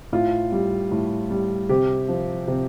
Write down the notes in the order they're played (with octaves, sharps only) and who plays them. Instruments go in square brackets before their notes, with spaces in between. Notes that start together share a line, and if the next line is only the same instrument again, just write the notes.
[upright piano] A2 F4
G3
A2
G3
C3 G4
F3
C3